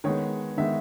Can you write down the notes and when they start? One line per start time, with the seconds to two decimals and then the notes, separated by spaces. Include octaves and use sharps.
0.04 D#3 G#3 B3 C#5
0.58 D#3 G#3 B3 E5